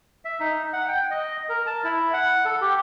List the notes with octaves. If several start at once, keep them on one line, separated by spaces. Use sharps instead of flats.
E5
D#4
F#5
G5
D#5
A#4
A5
E4
F#5
A4
G4